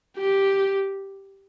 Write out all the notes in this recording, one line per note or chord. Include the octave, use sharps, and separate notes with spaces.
G4